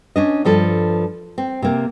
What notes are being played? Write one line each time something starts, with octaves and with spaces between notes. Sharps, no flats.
C#4 D4 D#5
G2 F3 A4
C4
C3 A#3